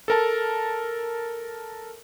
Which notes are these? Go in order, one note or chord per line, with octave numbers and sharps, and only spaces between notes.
A4 A#4 A5